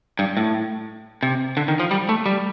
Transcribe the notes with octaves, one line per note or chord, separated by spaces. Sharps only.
G2
A2
C3
D3
D#3
F3
G3
A3
G3